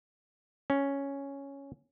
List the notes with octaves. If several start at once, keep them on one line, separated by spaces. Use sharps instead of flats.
C#4